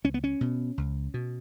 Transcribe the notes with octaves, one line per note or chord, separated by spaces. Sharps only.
C#2 C#4
B3
C#4
B2
C#2
B2